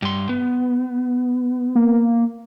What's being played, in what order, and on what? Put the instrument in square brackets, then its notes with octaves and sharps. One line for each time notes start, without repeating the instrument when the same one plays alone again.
[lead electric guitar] G2 C6
B3
[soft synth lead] A#3